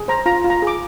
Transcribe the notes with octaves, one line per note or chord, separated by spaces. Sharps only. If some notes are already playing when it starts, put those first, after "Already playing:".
Already playing: G#4
C5 A#5
F4 A#5
F4
A#5
G#4 D6